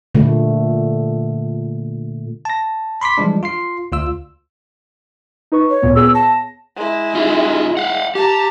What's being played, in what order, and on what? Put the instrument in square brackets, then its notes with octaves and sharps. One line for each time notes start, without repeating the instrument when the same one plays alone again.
[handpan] A#2 D3 A3
[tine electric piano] A5 A#6
B5 C6 D6 B6
E3 F3 G3 G#3 D4
F4 C6 C7
D2 F4 E6
[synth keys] D#4 B4 C#6
[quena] C#5
[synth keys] D2 A#2 B3
[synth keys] B3 G#4 C#5 [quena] E6
[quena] A5 [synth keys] A#6
[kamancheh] G#3 E4
[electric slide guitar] D#4 F4
F5 F#5
[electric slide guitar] G4 [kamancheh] A5 A#5